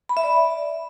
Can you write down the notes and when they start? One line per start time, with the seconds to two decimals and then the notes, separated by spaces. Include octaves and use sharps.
0.09 B5
0.17 E5
0.24 D5